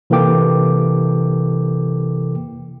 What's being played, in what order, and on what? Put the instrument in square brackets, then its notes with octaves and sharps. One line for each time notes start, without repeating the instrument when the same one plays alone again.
[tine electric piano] C3 E3 A#3 A4 G5 D6